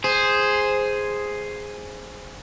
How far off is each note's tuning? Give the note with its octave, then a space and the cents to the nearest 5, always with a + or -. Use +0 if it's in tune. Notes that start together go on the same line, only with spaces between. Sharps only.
G#4 +0 C5 +0